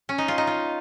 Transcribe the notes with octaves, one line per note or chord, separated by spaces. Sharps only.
C#4
D#4
F4
D#4
F4